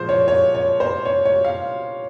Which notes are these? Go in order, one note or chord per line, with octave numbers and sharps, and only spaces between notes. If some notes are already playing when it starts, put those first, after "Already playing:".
Already playing: A#2 F3 G#3 C5
C#5
C#5
C#5
C5
C#5
C#5
F5